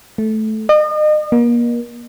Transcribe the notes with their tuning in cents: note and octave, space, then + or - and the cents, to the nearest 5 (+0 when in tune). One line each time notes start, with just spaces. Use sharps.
A3 -15
D#5 -40
A#3 +35